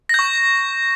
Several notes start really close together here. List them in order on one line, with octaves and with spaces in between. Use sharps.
A#6 G6 C#6